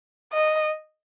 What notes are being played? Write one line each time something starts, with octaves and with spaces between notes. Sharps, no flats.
D#5